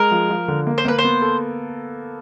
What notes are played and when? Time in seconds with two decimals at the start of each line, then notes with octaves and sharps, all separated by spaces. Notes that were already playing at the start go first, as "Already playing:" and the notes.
Already playing: G#3 A#4
0.11 F3
0.30 F3
0.48 D3
0.67 A#3
0.78 C5
0.85 A#3 B4
0.99 C5
1.04 B3
1.22 A4